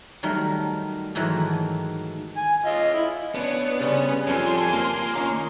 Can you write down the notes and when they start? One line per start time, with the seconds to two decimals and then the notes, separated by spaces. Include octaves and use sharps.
0.23 D#3 F#3 G3 A3 A#4
1.15 G#2 D#3 E3 F#3 A3
2.37 G#5
2.66 F4 D#5
2.94 E4
3.35 B3 C#4 D4 C#5 C#7
3.80 C#3 G3 C#4 C5 C#5
4.27 F2 F4 G#5 C6
4.73 A#3
5.15 D#3 C#4 A#5